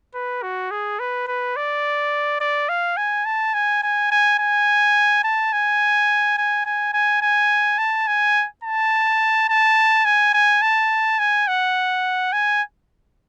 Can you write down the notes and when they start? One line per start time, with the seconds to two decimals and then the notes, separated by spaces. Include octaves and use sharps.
0.15 B4
0.43 F#4
0.71 G#4
1.00 B4
1.28 B4
1.57 D5
2.41 D5
2.69 F5
2.97 G#5
3.25 A5
3.54 G#5
3.83 G#5
4.11 G#5
4.40 G#5
5.24 A5
5.53 G#5
6.38 G#5
6.66 G#5
6.93 G#5
7.22 G#5
7.78 A5
8.08 G#5
8.64 A5
9.49 A5
10.05 G#5
10.34 G#5
10.62 A5
11.19 G#5
11.48 F#5
12.33 G#5